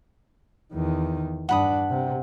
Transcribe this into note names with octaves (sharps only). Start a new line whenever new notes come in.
E2 D#3
G2 D4 F#5 B5 D#6
C3